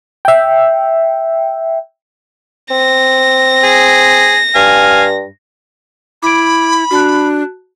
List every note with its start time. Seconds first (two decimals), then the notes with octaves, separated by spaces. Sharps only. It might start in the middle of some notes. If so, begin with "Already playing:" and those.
0.25 E5 G5
2.71 C4 A#6
3.64 G#4
4.55 G2 F5 G#5
6.23 E4 B5 D6 D7
6.91 D4 F#4 A5 F#6